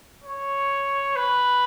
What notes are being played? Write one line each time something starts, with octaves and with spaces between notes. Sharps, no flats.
C#5
B4